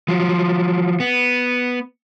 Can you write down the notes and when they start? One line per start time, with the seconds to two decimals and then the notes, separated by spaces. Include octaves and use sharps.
0.08 F3 F#3
1.00 B3